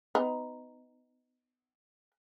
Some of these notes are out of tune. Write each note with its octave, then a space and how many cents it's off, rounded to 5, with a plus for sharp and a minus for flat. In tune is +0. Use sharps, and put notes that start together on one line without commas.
B3 +30 D#4 +0